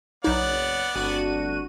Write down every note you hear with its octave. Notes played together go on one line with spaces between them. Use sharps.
F#1 B1 B3 D#4 C#5 D5 F#5
G1 A3 C4 D4 F#4 D#7